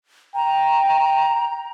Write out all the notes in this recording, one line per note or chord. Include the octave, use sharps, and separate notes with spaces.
G5 A#5